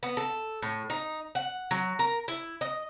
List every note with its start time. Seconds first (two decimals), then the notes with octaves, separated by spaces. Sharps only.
0.03 B3
0.17 A4
0.62 A2
0.90 D#4
1.35 F#5
1.71 F#3
1.99 A#4
2.28 E4
2.61 D#5